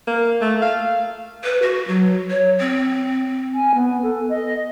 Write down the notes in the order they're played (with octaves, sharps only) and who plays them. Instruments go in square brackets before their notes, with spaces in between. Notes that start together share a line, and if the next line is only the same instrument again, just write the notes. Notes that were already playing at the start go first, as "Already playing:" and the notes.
[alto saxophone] A#3
A3
F5
[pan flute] B4
F#4
F#3
C#5
C4
[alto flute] G#5
B3
A4
D#5